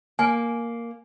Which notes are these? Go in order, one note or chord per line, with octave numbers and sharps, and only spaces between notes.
A#3 G#5